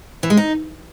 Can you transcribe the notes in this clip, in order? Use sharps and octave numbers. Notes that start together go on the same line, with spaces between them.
E3
G#3
D#4